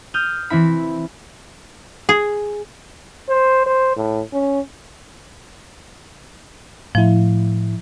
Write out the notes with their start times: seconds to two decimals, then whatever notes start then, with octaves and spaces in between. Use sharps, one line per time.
0.14 D#6 F6 G6
0.50 E3 C4 E4 B5
2.09 G#4
3.29 C5
3.67 C5
3.96 A2
4.33 C#4
6.95 A2 F3 E4